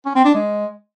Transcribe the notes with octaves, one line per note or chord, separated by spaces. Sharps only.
C#4
C4
D4
G#3